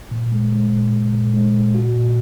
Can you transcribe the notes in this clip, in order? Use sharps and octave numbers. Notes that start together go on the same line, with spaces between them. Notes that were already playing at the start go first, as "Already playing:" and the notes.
A#2
G#3
G#3
A#2
A#2
A#2
G#3
A#2
F#4
A#2